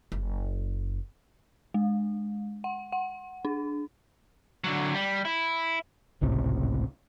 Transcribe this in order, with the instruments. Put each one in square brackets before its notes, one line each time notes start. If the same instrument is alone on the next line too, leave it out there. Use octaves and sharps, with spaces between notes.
[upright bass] F#1
[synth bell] G#3
F#5
F#5
D4
[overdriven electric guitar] D3 F#3
G3
E4
[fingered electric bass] G#1 C#2 A2 C3